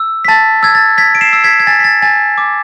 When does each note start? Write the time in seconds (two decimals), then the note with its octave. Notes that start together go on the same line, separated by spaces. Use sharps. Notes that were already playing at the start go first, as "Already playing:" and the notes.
Already playing: E6
0.25 B6
0.28 A5 A6
0.63 E6 G#6
0.75 A6
0.97 E6 G#6 B6
1.15 D7
1.21 C7 E7
1.33 E6
1.44 G#6 B6
1.60 G#6
1.67 G#5 A6
1.80 B6
1.84 A6
2.02 G#5 A6
2.38 D6